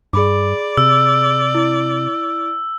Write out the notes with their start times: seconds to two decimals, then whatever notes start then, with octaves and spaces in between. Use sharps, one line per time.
0.13 G2 G#4 D5 B5 D6
0.77 C3 E6
1.55 E4